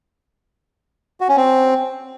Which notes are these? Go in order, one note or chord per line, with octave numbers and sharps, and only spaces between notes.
F#4
C#4
C4